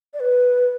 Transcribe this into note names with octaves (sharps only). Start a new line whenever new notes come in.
D5
B4